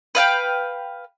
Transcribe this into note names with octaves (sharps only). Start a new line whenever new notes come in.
B4 F5 G5